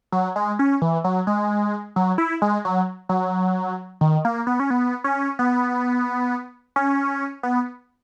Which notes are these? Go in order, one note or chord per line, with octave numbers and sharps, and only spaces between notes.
F#3
G#3
C#4
E3
F#3
G#3
F#3
E4
G#3
F#3
F#3
D#3
A#3
B3
C#4
B3
C#4
B3
C#4
B3